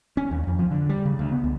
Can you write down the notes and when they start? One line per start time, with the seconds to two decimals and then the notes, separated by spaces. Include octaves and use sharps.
0.17 C#4
0.31 D#2
0.47 F2
0.59 F3
0.71 D3
0.89 G3
1.05 C#3
1.19 D2
1.32 B3
1.44 C#2